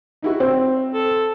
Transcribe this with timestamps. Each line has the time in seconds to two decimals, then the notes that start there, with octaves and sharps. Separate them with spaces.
0.22 D#4 E4 F#4
0.40 C4
0.94 A4